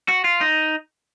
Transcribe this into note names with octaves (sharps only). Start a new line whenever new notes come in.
F#4
F4
D#4